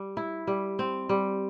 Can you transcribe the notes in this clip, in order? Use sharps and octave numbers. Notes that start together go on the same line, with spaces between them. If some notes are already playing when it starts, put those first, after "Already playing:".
Already playing: G3
E4
G3
C4
G3